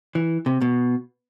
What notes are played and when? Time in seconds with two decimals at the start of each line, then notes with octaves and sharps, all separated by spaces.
0.15 E3
0.46 C3
0.61 B2